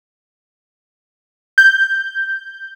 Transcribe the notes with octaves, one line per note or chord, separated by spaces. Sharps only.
G6